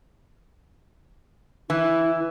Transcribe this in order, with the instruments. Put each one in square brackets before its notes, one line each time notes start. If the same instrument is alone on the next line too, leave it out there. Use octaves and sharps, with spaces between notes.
[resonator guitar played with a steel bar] E3 [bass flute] E4